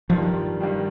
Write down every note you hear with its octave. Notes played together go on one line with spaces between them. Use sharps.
G2 D#3 F3 G3
G2 D#3 G3